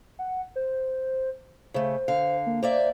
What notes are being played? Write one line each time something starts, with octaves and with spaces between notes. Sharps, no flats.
F#5
C5
C#3 A3 C5
D3 F5
A#3
A#3 C5 D5 E5